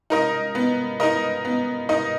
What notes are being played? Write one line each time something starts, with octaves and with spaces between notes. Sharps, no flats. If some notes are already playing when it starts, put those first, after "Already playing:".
D#4 A#4 D#5
B3
D#4 A#4 D#5
B3
D#4 A#4 D#5